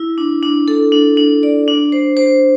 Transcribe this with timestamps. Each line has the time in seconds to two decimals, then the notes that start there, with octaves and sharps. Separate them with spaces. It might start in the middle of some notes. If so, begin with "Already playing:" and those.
Already playing: E4
0.18 D4
0.43 D4
0.68 A4
0.92 D4
1.17 D4
1.43 D5
1.68 D4
1.92 C5
2.17 C5